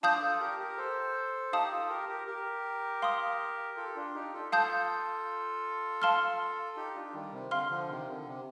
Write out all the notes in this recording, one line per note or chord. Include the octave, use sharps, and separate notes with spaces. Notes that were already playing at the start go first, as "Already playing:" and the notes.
D4 F4 F5 A5 D#6 G6
F4 A4
G4 A#4
G4 A#4
A4 C5
D#4 G4 F5 A5 D#6
F4 A4
G4 A#4
G4 A#4
G4 A#4
F5 C6 D#6
F4 A4
D4 F4
D#4 G4
F4 A4
F4 A4 F5 A5 D#6 G6
F5 A5 C6 F6
D#4 G4
D4 F4
D#3 G3
C3
D3 F5 C6 F6
D3 F3
C3 D#3
D3
C3